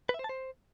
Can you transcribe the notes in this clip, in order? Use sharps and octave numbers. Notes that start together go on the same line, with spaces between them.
B4
E5
C5
A5
C5